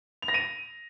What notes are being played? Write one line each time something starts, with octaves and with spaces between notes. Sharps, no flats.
F7
A#6
D#7